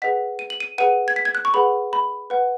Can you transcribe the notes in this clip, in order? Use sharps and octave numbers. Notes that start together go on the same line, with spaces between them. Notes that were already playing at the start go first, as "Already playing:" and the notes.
G#4 B4 D#5 F#5 B6
D#7
F#7
D#7
G#4 B4 F#5 D#7
G#6
B6
G#6
F#6
C#6
G#4 B4 F#5 B5
B5
B4 F#5